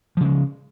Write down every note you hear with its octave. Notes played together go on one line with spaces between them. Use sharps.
C#3 F3 G#3